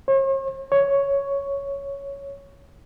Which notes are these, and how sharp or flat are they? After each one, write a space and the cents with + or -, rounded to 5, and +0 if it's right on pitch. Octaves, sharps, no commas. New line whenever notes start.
C#5 -45
C#5 +5